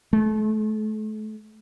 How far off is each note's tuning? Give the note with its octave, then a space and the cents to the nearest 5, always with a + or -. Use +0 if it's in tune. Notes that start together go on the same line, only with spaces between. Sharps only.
A3 -35